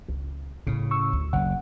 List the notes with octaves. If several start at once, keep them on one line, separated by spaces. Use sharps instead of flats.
C#2
A2 C#3 C#4
C#6 E6
D2
F#1 F#5